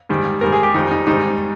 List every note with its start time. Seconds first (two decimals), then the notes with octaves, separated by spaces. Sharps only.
0.09 G#2 D#3 G3
0.41 G#2 D#3 G3 A#4
0.52 G#4
0.63 G4
0.74 F2 D#3 G3 D#4
0.91 D#4
1.07 G#2 D#3 G3 D#4